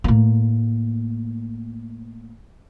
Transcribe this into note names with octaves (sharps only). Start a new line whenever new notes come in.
A2 A#3